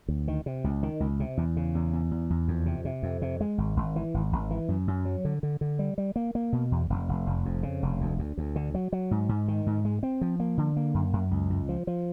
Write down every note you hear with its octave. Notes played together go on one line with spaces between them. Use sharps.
D2
D#3
C3
C#2
D#3
C#2
C3
E2
C#3
E2
E2
E2
E2
F2
C3
C3
F2
C3
G#3
G#1
G#1
E3
G#1
G#1
E3
F#2
F#2
F#3
D3
D3
D3
G3
G3
A#3
A#3
B2
E2
F1
F1
F1
F2
C#3
F1
D2
D2
D2
D3
F#3
F#3
G#2
G#2
D#3
G#2
G#3
C4
F3
A#3
D3
A#3
F#2
F#2
C#2
C#2
F3
F3